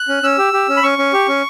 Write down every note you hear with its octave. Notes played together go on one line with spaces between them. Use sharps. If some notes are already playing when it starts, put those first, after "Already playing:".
Already playing: F#6
C#4
C#4 E6
G4
G4
C#4
B5
C#4 C#6
C#4
G4
C#4